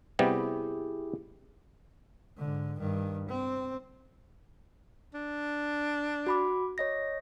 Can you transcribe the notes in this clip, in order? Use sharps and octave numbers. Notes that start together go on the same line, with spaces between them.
C3 G3 B3 E4 G4 G#4
G#2 D3
G2 D#3
C4
D4
F#4 B5 D6
C#5 D#5 A#6